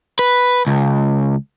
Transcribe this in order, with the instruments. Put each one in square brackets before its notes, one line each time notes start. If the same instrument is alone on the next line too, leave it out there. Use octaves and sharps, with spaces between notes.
[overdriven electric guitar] B4
C#2